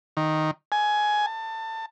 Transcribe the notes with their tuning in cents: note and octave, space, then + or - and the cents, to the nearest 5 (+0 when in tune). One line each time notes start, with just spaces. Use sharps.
D#3 +0
G#5 +15
A5 +25